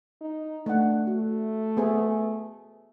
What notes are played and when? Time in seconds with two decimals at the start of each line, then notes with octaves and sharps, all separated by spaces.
0.21 D#4
0.66 A3 D4 F#5
1.07 A3 F#4
1.77 B3 G#4 C5